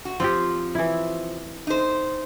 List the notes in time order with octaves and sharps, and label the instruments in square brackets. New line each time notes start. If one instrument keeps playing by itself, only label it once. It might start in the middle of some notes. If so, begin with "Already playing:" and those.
[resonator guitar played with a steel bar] F#4
[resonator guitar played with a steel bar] F3 [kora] C4 F4 G4
[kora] E3 E4
[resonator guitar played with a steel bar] D#4 C5